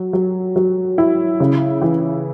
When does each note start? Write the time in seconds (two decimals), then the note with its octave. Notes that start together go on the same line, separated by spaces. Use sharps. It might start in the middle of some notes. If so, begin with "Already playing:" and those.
Already playing: F#3
0.13 F#3
0.56 F#3
0.98 E4
1.40 C#3
1.82 E3